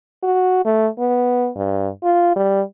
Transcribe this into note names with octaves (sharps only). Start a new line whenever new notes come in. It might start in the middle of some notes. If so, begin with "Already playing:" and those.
F#4
A3
B3
G2
F4
G3